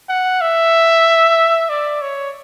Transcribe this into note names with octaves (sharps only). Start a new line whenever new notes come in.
F#5
E5
D5
C#5